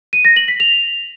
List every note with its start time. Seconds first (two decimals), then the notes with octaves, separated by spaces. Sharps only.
0.13 D#7
0.25 A#6
0.36 F#7
0.48 B6
0.60 F7